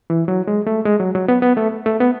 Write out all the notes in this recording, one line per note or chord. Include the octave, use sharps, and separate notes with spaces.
E3
F#3
G#3
A3
G#3
F#3
F#3
B3
B3
A3
A3
B3